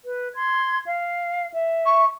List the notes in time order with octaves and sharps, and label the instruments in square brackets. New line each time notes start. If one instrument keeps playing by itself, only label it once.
[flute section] B4
C6 G#6
F5
E5
[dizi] C#6